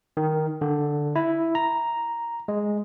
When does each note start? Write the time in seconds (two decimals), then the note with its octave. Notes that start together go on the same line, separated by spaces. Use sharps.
0.17 D#3
0.61 D3
1.16 E4
1.55 A#5
2.48 G#3